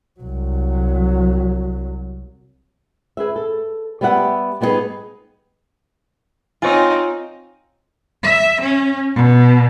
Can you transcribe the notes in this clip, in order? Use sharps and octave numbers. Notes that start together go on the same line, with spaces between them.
C2 F#3
G#4 B4 E5
A4
G3 B3 G4 E5 F#5
G3 B3 D#4 F4 G#4 B4
C4 D#4 F4 C#5 G#5
E5
C#4
B2